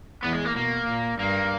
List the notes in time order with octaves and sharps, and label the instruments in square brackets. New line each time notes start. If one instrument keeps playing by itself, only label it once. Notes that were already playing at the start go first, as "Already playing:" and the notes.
[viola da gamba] E2 [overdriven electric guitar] B3
[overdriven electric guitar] G#3
A#3
[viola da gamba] B2 [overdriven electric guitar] A#3
[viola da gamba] A#2
[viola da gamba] G2 [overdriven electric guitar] A#3